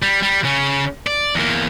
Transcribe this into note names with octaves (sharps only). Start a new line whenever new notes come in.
G3
G3
C#3 C#4
D5
E2 A#3